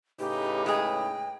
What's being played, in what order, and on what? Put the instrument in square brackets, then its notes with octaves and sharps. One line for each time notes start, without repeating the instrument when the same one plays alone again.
[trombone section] A2 C#3 B4 [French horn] D#4 [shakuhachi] G4
[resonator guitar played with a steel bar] G#3 G#4 [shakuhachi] G5